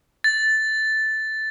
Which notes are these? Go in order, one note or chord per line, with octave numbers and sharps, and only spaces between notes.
A6